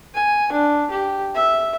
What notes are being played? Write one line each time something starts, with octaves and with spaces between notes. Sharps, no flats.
G#5
D4
G4
E5